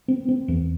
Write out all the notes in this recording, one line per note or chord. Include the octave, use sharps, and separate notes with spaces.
C4
C4
E2